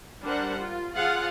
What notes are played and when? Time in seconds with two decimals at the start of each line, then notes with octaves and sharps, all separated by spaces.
0.22 G3 D4 A#4 C5 F#5
0.60 F4
0.94 F3 F4 G#4 F5 F#5